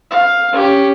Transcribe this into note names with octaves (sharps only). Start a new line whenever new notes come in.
F5
C#4 G4